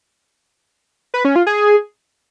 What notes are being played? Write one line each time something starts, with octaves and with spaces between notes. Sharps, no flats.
B4
C#4
F4
G#4